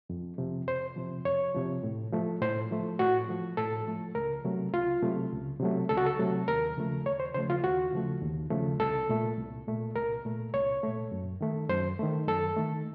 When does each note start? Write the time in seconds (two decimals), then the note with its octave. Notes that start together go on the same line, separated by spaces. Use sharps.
0.10 F2
0.38 C3 F3
0.67 F2 C5
0.96 C3 F3
1.25 F2 C#5
1.55 C3 F3
1.83 A2
2.12 F3 A3
2.41 A2 C5
2.71 F3 A3
2.99 A2 F#4
3.29 F3 A3
3.57 A2 A4
3.87 F3 A3
4.15 C#2 A#4
4.44 C3 F#3 A3
4.73 C#2 F4
5.02 C3 F#3 A3
5.32 C#2
5.60 C3 F#3 A3
5.89 C#2 A4
5.97 F#4
6.06 A4
6.19 C3 F#3 A3
6.48 D#2 A#4
6.77 C#3 F3 A3
7.05 D#2 C#5
7.20 C5
7.35 C#3 F3 A3 C5
7.50 F4
7.64 D#2 F#4
7.92 C#3 F3 A3
8.22 D#2
8.50 C#3 F3 A3
8.80 C2 A4
9.09 A#2 A3
9.38 C2
9.67 A#2 A3
9.95 C2 A#4
10.25 A#2 A3
10.54 C2 C#5
10.83 A#2 A3
11.12 F#2
11.41 D#3 A3
11.69 F#2 C5
11.99 D#3 A3
12.27 F#2 A4
12.56 D#3 A3